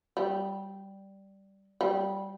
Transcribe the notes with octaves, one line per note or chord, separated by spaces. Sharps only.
G3
G3